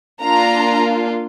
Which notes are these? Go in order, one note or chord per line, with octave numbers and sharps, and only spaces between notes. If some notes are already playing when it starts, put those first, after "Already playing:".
A#3 D4 F4 A#5